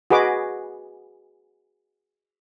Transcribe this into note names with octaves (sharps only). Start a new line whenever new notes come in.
F#4 G#4 B4 D#5 D6